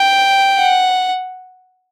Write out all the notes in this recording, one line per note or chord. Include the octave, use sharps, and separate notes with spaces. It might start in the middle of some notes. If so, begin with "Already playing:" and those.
Already playing: G5
F#5